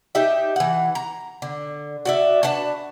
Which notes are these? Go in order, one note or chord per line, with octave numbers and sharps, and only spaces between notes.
D#4 G4 E5
E3 F#5
A#5
D3
F#4 D5 E5
D4 F#4 B4 A5